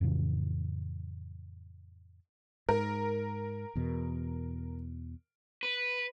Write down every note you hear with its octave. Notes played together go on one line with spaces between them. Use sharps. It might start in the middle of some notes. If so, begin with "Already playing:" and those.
F2 A2 C#3 E3
G#2 A#4
E2 B2
B4